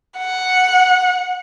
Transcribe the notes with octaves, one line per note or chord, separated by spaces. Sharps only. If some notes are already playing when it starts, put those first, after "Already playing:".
F#5